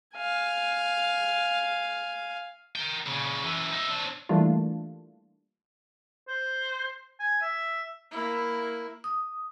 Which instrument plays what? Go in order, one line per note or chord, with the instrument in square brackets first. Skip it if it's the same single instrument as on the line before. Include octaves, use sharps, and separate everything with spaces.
[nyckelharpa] F5 G#5
[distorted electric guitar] A#4 G5
A#2 C#3
F#2 E3
D#4 E5
C4 D4
[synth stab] E3 G3 A3 A#3 D4 F4
[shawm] C5
G#5
E5
[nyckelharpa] A#3 E4
[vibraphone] D#6